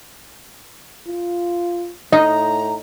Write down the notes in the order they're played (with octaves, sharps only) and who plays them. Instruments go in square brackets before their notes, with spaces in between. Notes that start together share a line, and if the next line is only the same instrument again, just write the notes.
[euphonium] F4
[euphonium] A2 [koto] D#4 [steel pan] D#5 [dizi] A#5